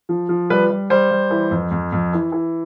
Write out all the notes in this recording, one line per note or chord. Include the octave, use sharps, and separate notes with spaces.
F3
F3
G3 B4
G3
G3 C5
G3
E3
F2
F2
F2
E3
E3